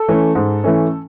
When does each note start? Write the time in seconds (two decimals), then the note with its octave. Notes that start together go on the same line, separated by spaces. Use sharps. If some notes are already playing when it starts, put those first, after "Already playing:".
Already playing: A4
0.08 E3 A3 C#4
0.35 G#2
0.64 E3 A3 C#4